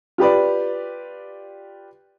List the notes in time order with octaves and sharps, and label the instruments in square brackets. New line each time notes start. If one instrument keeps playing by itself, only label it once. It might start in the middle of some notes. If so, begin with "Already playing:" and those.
[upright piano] F4 G4 B4 D5